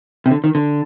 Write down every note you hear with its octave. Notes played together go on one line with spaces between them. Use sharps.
C3
D3
D#3
D3